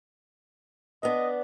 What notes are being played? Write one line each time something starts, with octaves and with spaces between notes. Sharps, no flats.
B3 D4 D#5